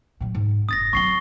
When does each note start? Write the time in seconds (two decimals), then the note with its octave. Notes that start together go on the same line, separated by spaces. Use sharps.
0.21 A#2 F#3
0.35 G#2
0.69 F1 D#6 A6 A#6
0.93 F#3 C4 C#6 C7 G7